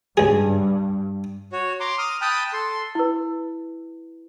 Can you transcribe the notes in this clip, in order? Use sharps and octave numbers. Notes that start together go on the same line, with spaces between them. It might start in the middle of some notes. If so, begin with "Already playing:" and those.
C#2 G2 G#4
F#4 C#5
A#5 C6 D6
D#6 F6
G5 A5 B5 D#6 F#6
A4 C6
E4 B4